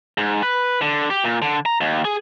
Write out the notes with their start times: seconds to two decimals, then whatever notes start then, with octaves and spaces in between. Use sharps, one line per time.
0.18 G#2
0.43 B4
0.82 D3
1.10 G4
1.24 A#2
1.42 D3
1.66 A#5
1.81 D#2
2.05 G#4